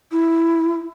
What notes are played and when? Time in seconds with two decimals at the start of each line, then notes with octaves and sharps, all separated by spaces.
0.12 E4